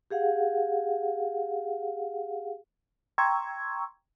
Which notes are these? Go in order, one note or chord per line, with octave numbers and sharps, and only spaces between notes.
G4 G#4 F5 F#5
G5 A#5 C6 C#6 E6 G#6